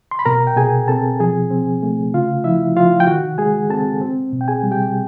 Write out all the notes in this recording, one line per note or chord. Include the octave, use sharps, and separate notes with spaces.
C6
B5
B2 A#4 A#5
G5
B2 G#4 G#5
C4 A4 A5
F3 G#4 G#5
C4
A3
C#3 F4 F5
F3 E4 E5
F3 F4 F5
G5
D#3 F#4 F#5
G#3 G#4 G#5
C4 A4 A5
C4
B2
G5
G#4 G#5
G3
G4 G5